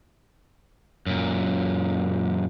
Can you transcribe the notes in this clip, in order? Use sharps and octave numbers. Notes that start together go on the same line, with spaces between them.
F#2 A#2